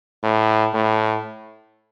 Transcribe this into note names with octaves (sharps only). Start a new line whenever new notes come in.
A2
A2